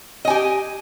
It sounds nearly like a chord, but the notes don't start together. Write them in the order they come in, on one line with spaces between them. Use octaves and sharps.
D#5 G#5 G4